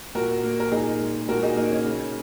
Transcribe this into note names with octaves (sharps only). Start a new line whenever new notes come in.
A#2 F#4 A#4
A#3
A#4
A#2 D#4 G#4
G#3
A#2 F#4 A#4
D#4 G#4
A#3 D#4
C#4
C#3